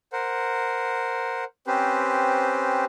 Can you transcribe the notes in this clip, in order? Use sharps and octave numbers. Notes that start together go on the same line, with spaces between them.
A#4 C5 F#5
C4 C#4 G4 B4 C5